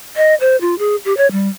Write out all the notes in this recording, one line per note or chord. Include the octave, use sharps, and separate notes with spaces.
D#5
C5
F4
G#4
G4
C#5
G3